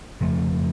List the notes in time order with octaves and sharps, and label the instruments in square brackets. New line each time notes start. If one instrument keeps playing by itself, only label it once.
[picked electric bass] F2 C#3 F3 A3